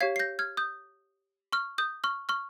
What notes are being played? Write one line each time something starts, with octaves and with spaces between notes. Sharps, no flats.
G4 C#5 F5 G#6 C7
C7
G6 A#6
F6 G#6
D#6 G6
C#6 F6
D#6 G6
C#6 F6
C#6 F6